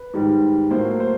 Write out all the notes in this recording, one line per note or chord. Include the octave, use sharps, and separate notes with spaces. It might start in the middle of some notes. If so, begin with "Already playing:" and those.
Already playing: B4
G#2 D#3 G3
A2 F#3 A#3 C5
C5